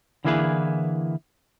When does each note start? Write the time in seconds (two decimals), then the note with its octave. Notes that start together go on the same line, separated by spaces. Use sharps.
0.24 D3 E3 A#3 E4 G#4 B4